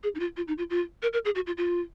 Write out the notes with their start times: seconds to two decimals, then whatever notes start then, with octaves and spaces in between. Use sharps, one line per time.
0.03 G#4
0.15 D#4
0.20 F4
0.37 F4
0.48 D#4
0.58 F4
0.70 F4
1.03 A#4
1.13 A#4
1.25 G#4
1.35 F#4
1.47 F4
1.58 F4